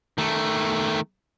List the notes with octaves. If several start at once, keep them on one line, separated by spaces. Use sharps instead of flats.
D#3 A3